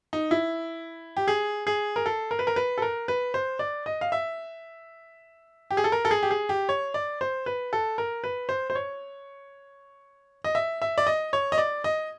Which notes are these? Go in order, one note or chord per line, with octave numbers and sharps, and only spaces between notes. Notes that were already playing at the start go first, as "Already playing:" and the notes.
D#4
E4
G4
G#4
G#4
A#4
A4
A#4
B4
A#4
B4
A4
A#4
B4
C5
D5
D#5
F5
E5
G4
G#4
A4
A#4
A4
G#4
G4
G#4
G4
C#5
D5
C5
B4
A4
A#4
B4
C5
C5
C#5
D#5
E5
E5
D5
D#5
C#5
D#5
D5
D#5